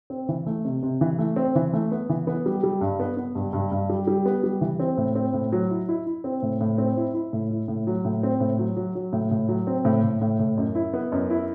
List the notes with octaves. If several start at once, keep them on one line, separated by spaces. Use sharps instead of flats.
C4
E3
A3
C3
C3
E3
A3
C4
E3
A3
B3
E3
B3
G3
G3
G2
B3
B3
G2
G2
G2
G3
G3
B3
G3
E3
C4
A2
C4
A2
F#3
E4
E4
E4
C4
A2
A2
C4
E4
E4
A2
E4
A2
F#3
A2
C4
A2
F#3
F#3
F#3
A2
A2
F#3
C4
A2
A2
A2
A2
F#2
E4
B3
F#2
E4